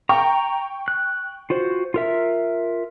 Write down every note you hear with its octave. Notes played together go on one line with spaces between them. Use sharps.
G5 A#5 C#6
F#6
F4 F#4 C5
F4 A#4 E5